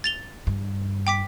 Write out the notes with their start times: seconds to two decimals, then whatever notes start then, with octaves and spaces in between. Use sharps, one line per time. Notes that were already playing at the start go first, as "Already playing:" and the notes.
0.04 A6 F7 G7
0.47 G2
1.07 G5 D6 B6